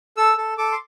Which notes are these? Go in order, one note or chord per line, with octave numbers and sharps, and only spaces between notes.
A4 E6
A4
A4 D6
C6